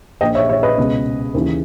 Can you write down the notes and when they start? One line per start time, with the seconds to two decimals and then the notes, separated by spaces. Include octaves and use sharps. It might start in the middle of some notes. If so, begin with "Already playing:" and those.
0.21 A#1 A#2 D#5 G5
0.35 C#5 E5
0.49 C#5 E5
0.63 B4 D#5
0.78 C#2 B2
1.34 D#2 C#3 E3